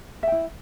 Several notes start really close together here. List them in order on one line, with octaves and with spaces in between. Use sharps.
E5 G5 E4